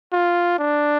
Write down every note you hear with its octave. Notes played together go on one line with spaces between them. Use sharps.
F4
D4